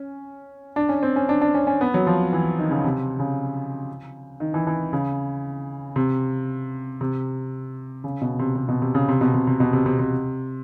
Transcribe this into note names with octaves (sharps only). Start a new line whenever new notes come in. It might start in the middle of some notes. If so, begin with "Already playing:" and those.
Already playing: C#4
D4
C#4
C4
C#4
D4
D4
C#4
C#4
B3
F#3
F3
E3
D#3
C#3
C3
C#3
D#3
E3
E3
C#3
C3
C3
C#3
B2
C3
C3
B2
C3
C#3
C3
B2
C3
C3
B2
C3
C3
C3